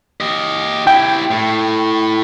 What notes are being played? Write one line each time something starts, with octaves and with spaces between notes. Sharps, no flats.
G4 D#5
E4 G4 G5
A2